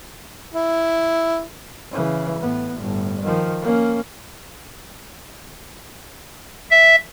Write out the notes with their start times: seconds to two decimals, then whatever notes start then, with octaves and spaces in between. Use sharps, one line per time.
0.54 E4
1.92 C#3 E3
2.39 A2 B3
2.76 G1 A2
3.23 D#3 F3
3.62 A#3 C#4
6.71 E5